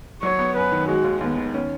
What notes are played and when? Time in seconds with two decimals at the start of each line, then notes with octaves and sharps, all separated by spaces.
0.22 F#3 C#5
0.39 B3
0.56 F#2 B4
0.71 D#3
0.88 G#3 F#4
1.04 D#2
1.21 D#2 B3
1.37 D#3
1.54 C#4